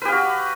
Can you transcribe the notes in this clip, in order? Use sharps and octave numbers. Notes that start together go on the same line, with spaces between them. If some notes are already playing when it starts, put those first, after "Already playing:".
F#4 G4 B4 F5